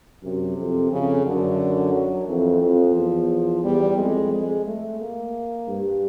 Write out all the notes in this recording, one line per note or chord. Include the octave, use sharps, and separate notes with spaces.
F#2 C3
F2
F2 C#3
F#2 D3
F#3
F2 E3
F2 F3
E2
E2 G3
F2 G#3
G#3
A3
A#3
G2